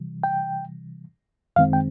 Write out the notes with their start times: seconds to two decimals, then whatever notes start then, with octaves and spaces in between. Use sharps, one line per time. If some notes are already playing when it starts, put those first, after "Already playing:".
Already playing: C3 E3 G3
0.23 G5
1.56 F#2 D#3 G#3 C4 F5
1.73 G5